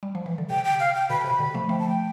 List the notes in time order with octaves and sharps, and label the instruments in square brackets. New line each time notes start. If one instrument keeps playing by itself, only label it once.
[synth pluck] G3
F3
E3
D3
[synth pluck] C3 [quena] G5
[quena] G5
F5
G5
[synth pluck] B2 D3 [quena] B5
[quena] A5
[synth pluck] C3 [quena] B5
[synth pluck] B2 D3
F3 A3
[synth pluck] F3 A3 [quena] G5
[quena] A5
G5